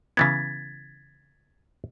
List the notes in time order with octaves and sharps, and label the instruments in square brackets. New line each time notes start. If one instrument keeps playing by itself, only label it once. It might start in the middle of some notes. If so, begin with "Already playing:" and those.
[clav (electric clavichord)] C#3 E3 B3 [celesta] G#6 A6 B6